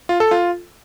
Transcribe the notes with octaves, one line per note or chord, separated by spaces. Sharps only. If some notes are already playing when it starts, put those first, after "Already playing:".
F4
A4
F4